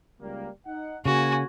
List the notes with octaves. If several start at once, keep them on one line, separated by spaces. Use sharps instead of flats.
C#2 G3 A#3
D#4 F#5
C#3 A#3 F#4 G#5